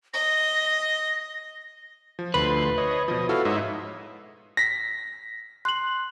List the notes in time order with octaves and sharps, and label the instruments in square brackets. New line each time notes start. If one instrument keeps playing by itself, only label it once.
[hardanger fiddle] D#5 [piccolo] A#6
[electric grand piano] F3
[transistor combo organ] D2 C6 [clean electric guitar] B4
[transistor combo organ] C#5 D#5
[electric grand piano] B2 F3 [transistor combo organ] D#5
[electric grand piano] E4 F#4 A4 [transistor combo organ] F5
[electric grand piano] G#2 [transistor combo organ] C#5 D#5 E5
[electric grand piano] A#6 B6
[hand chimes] C6 [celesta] F#6 F#7